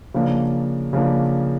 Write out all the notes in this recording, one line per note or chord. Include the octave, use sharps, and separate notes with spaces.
C#3 F3 A#3 D4
C#3 F3 A#3 D4